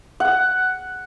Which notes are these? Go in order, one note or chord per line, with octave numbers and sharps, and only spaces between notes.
F#5